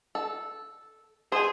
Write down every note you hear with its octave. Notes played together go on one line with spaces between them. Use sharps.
A4
G#4 C5 G#5